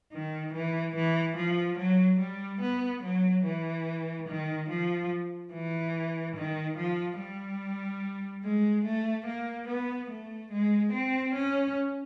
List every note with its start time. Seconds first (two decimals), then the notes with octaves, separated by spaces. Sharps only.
0.13 D#3
0.54 E3
0.95 E3
1.37 F3
1.78 F#3
2.20 G3
2.62 B3
3.03 F#3
3.45 E3
4.28 D#3
4.70 F3
5.53 E3
6.36 D#3
6.77 F3
7.19 G3
8.44 G#3
8.85 A3
9.26 A#3
9.68 B3
10.10 A3
10.52 G#3
10.93 C4
11.35 C#4